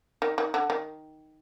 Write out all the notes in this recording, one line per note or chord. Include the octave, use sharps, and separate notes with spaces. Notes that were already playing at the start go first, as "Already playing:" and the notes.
D#3
D#3
D3
D#3